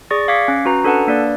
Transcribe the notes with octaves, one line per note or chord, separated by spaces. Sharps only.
G#4 D5 C#6 A6 A#6
F5 D6 G#6 B6 C#7
C#4
C#4 F#4 B4 A#5
D4 A4 B4 F#5 A5
A#3 D4 B4 D5